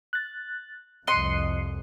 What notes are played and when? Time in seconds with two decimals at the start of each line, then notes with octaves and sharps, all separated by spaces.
0.13 F#6 A6
1.07 C2 F2 D#5 C6 F#6 C7 C#7